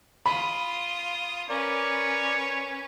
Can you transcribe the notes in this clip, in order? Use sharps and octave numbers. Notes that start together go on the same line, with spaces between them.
F4 B5 D#6
C#4 A#4 B4 C#5 D5